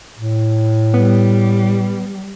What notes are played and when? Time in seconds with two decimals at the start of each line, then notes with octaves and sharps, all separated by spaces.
0.16 A2
0.94 G3 B3